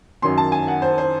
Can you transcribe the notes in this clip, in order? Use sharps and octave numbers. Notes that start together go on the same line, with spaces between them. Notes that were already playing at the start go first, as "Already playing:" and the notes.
F#2 D#3 F#3 C#4 C6
A5
G#5
F#5
C5
C5